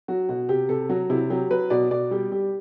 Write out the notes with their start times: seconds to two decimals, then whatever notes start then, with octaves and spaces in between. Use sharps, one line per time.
0.08 F#3 F#4
0.29 B2 F#4
0.49 C3 G4
0.69 C3 A4
0.89 F#3 F#4
1.10 C3 E4
1.30 F#3 G4
1.51 F#3 B4
1.70 B2 D5
1.91 B2 D5
2.11 G3 G4
2.31 G3 G4